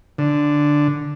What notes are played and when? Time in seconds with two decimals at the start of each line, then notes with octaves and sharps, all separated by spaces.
0.18 D3